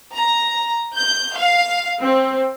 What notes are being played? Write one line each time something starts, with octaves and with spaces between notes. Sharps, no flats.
A#5
G6
F5
C4